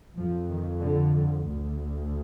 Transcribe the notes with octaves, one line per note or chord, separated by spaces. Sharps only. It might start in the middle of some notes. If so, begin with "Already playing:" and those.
F2 F3
D#3
D3
D2